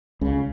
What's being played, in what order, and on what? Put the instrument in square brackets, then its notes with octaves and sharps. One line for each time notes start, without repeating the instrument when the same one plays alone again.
[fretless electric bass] C#2 C#3